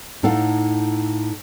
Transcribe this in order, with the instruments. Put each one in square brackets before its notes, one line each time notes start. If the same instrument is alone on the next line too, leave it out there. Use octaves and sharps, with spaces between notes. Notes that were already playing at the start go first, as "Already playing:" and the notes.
[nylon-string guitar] A2 D#4 A4 F5 F#5 A5